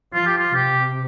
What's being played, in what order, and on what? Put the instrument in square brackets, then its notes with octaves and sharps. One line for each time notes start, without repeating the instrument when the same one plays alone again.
[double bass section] F3 [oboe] F4
[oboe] G4
F4
[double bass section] C3 [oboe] G4